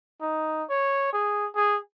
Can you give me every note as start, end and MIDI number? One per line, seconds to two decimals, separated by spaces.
0.21 0.63 63
0.69 1.08 73
1.13 1.48 68
1.55 1.78 68